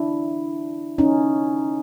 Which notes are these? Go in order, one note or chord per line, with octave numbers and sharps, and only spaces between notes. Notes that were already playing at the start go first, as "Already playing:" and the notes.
Already playing: D4 E4
C#4 D#4